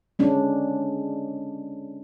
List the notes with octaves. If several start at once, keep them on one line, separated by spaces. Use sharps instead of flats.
G#3 C#4 D4